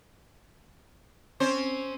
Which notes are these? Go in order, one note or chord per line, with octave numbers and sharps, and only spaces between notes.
C4 C#4 C5